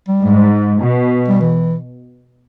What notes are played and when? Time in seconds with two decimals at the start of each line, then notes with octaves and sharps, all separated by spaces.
0.08 G3
0.23 G#2
0.82 B2
1.28 G3
1.41 E3